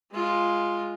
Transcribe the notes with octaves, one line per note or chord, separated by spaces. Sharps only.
G#3 F4